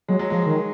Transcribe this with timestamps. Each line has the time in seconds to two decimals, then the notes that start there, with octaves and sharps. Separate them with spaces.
0.08 F#3 G#3
0.19 F#3
0.30 F3 G#3
0.46 D#3